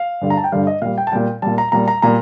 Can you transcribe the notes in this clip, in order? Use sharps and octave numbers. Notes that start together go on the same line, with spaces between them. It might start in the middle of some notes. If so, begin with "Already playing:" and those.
Already playing: F5
G2 D3 G3
A#5
A5
G5
G2 D3 G3 F5
D#5
A#2 G3 F5
G5
A5
A#2 G3 G5
A#2 G3 A5
A#5
A#2 G3 A#5
A#5
A#2 G3 A#5